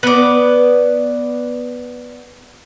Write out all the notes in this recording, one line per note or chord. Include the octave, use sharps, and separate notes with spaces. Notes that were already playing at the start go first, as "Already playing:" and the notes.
B3 D5